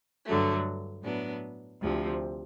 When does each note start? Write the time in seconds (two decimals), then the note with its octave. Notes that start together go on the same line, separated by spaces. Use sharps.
0.26 G2 D3 F#3 A3
1.03 A2 F#3 B3 D4
1.81 D2 C3 F3